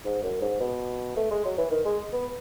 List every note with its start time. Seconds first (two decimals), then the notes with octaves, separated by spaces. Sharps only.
0.05 G#2
0.23 F#2
0.41 G#2
0.60 B2
1.17 A3
1.31 G#3
1.45 F#3
1.58 E3
1.71 D#3
1.85 G#3
2.13 B3